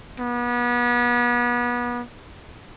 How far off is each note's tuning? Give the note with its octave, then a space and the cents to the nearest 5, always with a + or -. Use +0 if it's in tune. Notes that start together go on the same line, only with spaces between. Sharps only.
B3 -30